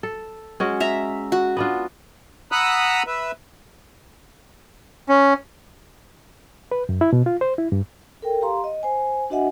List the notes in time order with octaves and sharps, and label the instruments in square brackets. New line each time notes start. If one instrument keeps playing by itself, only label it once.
[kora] A4
G#3 C#4 F#4
[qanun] E5 A#5
F#4
[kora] B3 D4 F4
[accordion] F#5 A#5 B5 D#6 E6 F#6
B4 E5
[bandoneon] C#4
[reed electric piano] B4
F#2
E4
B2
F4
C5
E4
G2
[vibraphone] A4 A#4 G5
G4 F5 A#5 C6
D#5
C5 G#5
D4 F#4 D#5 E5 F#5 G#5